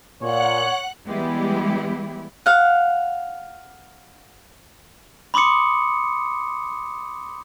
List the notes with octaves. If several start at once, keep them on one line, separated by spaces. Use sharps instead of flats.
A#2 C#5 F#5 F#6
E3 G3 G#3 B3 E4 G4
F5 F#5
B5 C6 D6 D#6 C#7